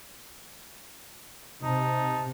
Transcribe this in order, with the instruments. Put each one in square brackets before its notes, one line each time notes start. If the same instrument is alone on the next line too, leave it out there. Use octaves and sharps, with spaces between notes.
[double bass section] C3 [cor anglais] D#4 [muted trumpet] A5